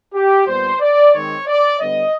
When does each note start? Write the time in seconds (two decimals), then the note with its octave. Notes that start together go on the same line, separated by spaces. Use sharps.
0.14 G4
0.47 A#2 G3 B3 C5
0.80 D5
1.13 D#3 G#3 C4 C#5
1.47 D5
1.80 D3 G3 B3 D#5